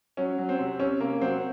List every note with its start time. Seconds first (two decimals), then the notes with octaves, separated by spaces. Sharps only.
0.17 F#3 C#4
0.38 F#3
0.49 C4
0.59 C3
0.80 C3 C#4
1.00 C3 A#3
1.21 F#3 C4